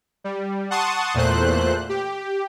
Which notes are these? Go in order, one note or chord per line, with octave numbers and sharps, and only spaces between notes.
G3
F#5 A5 C6 C#6 D#6
E2 A#2 A3 C5 F#6
G4